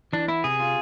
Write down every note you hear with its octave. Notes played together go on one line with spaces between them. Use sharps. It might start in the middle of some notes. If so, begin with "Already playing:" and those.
E3 D4
B3 E4
C3 G#4
F4